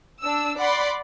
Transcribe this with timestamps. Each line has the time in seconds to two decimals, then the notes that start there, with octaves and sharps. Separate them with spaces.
0.21 D4 E6
0.57 D5 F#5 B5 C6